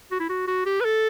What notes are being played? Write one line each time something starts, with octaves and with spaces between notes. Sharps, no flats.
F#4
E4
F#4
F#4
G4
B4
A4